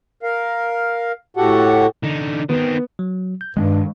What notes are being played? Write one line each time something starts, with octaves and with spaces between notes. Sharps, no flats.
A#4 F5
A2 F#4 G4 A4 F#5
D3 D#4
D#3 B3 C4
F#3
G6
G2 D#3 G#3 C4 D4